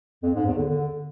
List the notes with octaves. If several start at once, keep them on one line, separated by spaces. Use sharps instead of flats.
F2
G#2
E2
D3
D3